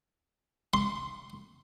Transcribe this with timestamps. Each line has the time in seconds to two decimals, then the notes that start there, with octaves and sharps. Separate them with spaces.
0.74 C6